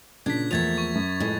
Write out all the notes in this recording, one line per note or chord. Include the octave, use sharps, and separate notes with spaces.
A#2 C#3 D4 G#6 B6
E2 F3 A3 A#3 E5 G#6 A6 F7
C#6
F#2
F2 A2 G#3 B4